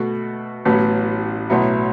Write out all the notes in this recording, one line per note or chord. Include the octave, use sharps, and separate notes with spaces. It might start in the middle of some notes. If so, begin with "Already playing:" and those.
Already playing: B2 A3 F#4
A1 A2 F#3 B3
B1 A2 F#3 B3 E4